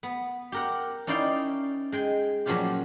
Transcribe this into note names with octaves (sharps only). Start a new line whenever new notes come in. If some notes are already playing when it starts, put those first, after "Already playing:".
B3
G4 A#4 F#5
C#4 D#4 E4 D5 F5 G5
G#3 G5 G#5
A#2 F3 F#3 C#4 F4 G4